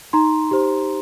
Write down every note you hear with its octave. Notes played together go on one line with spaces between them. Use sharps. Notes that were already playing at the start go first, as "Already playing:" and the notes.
D#4 A#5 C6
G4 C5